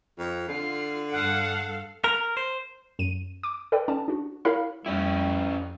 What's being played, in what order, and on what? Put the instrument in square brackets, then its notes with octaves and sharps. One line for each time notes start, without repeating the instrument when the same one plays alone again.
[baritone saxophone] F2
[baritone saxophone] D3 [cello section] F4 [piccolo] C7
[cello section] G2 A4 F5 [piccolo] F#5
[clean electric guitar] A#4
C5
[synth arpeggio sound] F#2 D#7
D6
A4 B4 D5 G5
C#4 D5 A5
D4 F#4
E4 G4 A#4 C#5 F5 B5
[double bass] F2 [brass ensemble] G3 [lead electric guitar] C#4 E4